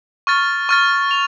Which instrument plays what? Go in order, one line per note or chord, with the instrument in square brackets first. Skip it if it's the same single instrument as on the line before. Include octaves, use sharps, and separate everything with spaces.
[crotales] C#6 F6 A6
C#6 F6 A6
F7